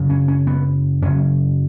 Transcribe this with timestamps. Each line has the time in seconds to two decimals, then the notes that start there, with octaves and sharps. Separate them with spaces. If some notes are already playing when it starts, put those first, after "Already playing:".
Already playing: F#2 C#3
0.10 C#4
0.28 C#4
0.47 B3
1.02 F#2 C#3 C#4